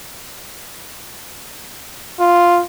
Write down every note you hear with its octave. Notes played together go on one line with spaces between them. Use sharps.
F4